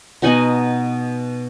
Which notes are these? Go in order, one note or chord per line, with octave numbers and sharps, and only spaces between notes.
B2 D#4 F#5 G#5